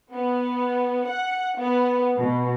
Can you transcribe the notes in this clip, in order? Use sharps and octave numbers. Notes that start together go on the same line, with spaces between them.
B3
F#5
B3
B2